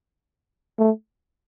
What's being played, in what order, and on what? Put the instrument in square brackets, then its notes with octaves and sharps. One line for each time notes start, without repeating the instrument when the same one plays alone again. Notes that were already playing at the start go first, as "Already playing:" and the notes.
[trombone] A3